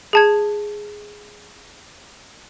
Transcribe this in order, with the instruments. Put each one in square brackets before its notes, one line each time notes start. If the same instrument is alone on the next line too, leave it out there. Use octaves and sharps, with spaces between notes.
[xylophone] G#4 A5 G#6